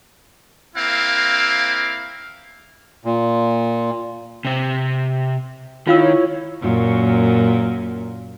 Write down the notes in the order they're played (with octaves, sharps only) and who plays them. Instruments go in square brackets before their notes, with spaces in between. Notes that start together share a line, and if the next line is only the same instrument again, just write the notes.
[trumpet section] A#3 C4 E4 F5
[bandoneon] A#2
[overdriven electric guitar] C3 C4
[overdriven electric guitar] D#3 [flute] E4 [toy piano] F4 F5 E6 [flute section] C#5
[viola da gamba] F#2 A#2